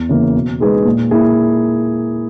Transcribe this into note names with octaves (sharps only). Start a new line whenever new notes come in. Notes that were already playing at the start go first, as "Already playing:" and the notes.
Already playing: E2
C#3 E3 A#3
B2
G#3 D#4 G#4 B4
A#2
A#3 E4 G#4